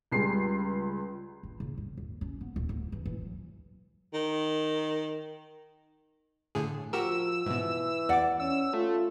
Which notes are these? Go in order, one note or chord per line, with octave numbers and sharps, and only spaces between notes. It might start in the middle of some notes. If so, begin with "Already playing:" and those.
C#2 G3 G#3 C7
D4
C#3
G2
D#2
C#4
B3
D1
D2
E3
E3
F#3
D#3
A2 D3 G#4
F3 F#4 G4 A#4 E6
G#2 B2 E3
E2 D5 F#5 D6
C#4 E6
A3 F4